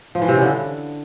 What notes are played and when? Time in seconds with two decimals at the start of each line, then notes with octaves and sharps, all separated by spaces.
0.15 F3
0.22 E3
0.28 C3
0.35 C#3
0.41 D3